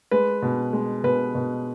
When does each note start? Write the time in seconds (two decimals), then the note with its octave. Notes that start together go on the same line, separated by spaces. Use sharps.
0.11 G#3 B4
0.42 B2
0.73 G#3
1.04 B2 B4
1.35 B2